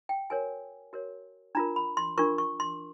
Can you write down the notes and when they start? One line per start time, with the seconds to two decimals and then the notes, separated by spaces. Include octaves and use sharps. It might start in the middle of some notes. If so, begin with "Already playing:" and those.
0.09 G5
0.30 F#4 A#4 C#5 G#5
0.93 F#4 A#4 C#5
1.55 D4 F4 A#4 A#5
1.76 B5
1.97 C6
2.18 D4 F4 A#4 C#6
2.38 C#6
2.60 C6